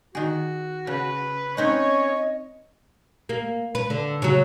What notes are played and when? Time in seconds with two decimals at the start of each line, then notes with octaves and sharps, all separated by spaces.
0.15 D#3 F#4 G#4
0.87 C#3 B4
1.57 C4 C#4 D#4 B4 C#5 D#5
3.29 A#3
3.75 B4
3.90 D3
4.22 C#3 F#3